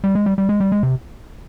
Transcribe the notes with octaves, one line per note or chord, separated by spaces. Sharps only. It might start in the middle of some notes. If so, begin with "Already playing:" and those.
G3
G#3
G3
G3
G#3
G3
G#3
C3